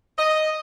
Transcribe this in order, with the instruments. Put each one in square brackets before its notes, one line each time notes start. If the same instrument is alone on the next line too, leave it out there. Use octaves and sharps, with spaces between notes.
[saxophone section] D#5